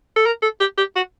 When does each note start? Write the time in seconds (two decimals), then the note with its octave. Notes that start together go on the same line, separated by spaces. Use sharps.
0.16 A4
0.26 A#4
0.43 A4
0.60 G4
0.78 G4
0.96 F#4